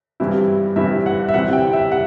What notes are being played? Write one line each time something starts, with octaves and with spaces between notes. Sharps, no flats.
G2 E3 G3 C4 E4
G2 E3 G3 C4 E4 E5
F#5
E5
C3 E3 G3 C4 F#5
G5
E5
C3 G3 F#5